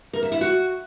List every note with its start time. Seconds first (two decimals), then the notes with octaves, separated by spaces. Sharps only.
0.13 A#4
0.23 E5
0.32 E4
0.41 F#4